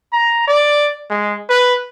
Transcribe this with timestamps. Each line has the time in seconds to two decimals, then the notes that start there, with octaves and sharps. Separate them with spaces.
0.13 A#5
0.48 D5
1.10 G#3
1.49 B4